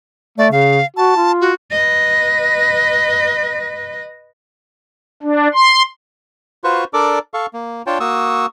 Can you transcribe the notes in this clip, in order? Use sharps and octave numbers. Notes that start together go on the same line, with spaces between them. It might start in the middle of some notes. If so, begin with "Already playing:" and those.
A3 D5
C#3 F5
F#4 A5
F4
F#4
B4 D#5
D4
C6
F4 F#4 B4 C5 C#6
D4 A4 A#4 D5 D6
A4 F5 C#6
A#3
D4 F4 C#5 G5 A5
A#3 F#4 C#6 D#6 E6